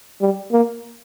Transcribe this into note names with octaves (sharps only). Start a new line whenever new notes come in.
G3
A#3